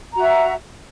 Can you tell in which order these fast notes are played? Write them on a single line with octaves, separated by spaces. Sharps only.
A#5 F#4 E5